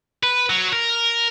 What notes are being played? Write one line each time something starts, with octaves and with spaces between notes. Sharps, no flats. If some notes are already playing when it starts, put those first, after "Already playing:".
B4
F#3
A#4